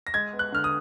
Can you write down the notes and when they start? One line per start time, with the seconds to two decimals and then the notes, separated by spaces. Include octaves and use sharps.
0.07 A#6
0.14 G#3 G#6
0.33 B3
0.39 F#6
0.52 D3 F6
0.64 D#6